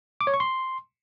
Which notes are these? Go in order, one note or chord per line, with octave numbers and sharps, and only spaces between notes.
D6
C#5
C#6
C6